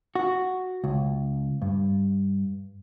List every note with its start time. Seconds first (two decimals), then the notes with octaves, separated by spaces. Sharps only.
0.15 F#4
0.84 C#2
1.62 G2